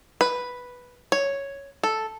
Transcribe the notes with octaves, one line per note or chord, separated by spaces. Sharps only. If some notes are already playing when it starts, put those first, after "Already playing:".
B4
C#5
A4